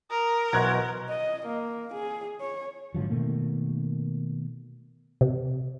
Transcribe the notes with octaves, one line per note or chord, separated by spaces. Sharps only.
A#4 D#6
B1 E3 F#4 C5 D#5 F#6 G#6
D#5
A#3
G#4
C#5
G#2 D3 F3 F#3
B2 D#3 A3 A#3
C3